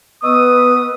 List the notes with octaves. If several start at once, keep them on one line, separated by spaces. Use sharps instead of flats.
B3 B4 D#5 C#6 D#6 E6